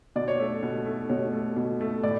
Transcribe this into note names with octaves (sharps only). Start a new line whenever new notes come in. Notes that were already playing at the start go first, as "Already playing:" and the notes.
B2 D5
C#5
A3
B2
A3
B2 C#5
A3
B2
A3
A2 D5